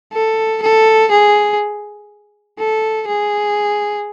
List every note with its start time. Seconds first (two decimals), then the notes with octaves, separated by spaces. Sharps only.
0.13 A4
0.62 A4
1.11 G#4
2.59 A4
3.08 G#4